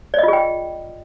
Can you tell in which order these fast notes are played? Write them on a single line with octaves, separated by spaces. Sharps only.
D5 D#5 F4 G#4 G5